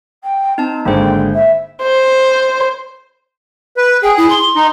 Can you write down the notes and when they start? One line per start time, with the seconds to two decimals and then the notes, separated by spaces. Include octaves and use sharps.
0.23 G5
0.58 C4 D#4 A5
0.85 G#1 D3 G#3 A#3 C5 G5
1.34 E5
1.82 C5
3.77 B4
4.03 G#4 G5
4.17 E4
4.30 C6
4.56 D#4